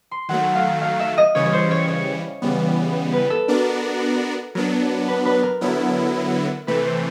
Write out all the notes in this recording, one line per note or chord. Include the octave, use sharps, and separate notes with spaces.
C6
D#3 F#3 A3 F#5
F5
F5
E5
D#5
C#3 E3 G3 C#5
C#5
C5
C#5
C#5
C#3 E3 G3 B3
B4
A4
B3 D4 F#4 A#4 D5
F#3 B3 D4 A#4
B4
B4
A#4
D3 F#3 B3 E4
C3 E3 A3 B4
C5